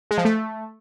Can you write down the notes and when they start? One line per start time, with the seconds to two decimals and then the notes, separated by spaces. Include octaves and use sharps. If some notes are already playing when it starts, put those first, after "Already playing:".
0.11 G#3
0.18 F3
0.25 A3